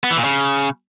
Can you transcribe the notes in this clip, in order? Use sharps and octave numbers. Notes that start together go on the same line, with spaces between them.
B3
E3
A#2
C#3